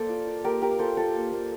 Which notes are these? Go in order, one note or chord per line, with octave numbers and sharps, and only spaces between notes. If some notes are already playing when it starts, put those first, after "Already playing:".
Already playing: A#3 A4 C5 D5
F4
F4
A#3 G4 A#4
A#3 G4 A#4
F4 A4 C5
F4 A4 C5
A#3
A#3